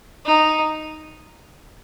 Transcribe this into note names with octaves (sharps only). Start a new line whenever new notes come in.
D#4